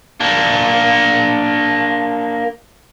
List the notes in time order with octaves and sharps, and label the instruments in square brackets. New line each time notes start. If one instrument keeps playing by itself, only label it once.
[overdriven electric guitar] A#3 D4